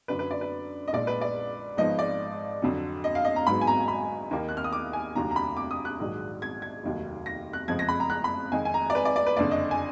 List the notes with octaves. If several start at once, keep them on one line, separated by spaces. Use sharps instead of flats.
F#2 D3 F#3 D4 B4
B4
D5
B4
D#5
A#1 A#2 G#3 D#4 D5
B4
D5
G#1 G#2 F3 B3 D#4 D#5
D5
F2 D3 F#3
D#5
F5
D#5
A#5
G#1 G#2 F#3 B3 B5
G#5
A#5
B5
D#2 D#3 A#3 D#4
F#6
F6
D#6
D6
G#5
F1 D#2 D3 F#3 A#5
A#5
B5
D6
D#6
F#6
A#1 G#2 D#3 F#3
G#6
G#6
F1 D#2 D#3 F#3
A#6
F#6
F#1 F2 F3 G#3 G#6
A#6
B5
A#5
F#6
B5
F2 D#3 G#3 G#5
G#5
A#5
D5
B4
D5
D5
B4
F#1 F2 D3 D5
D#5
G#5